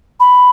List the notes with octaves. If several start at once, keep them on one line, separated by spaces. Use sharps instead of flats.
B5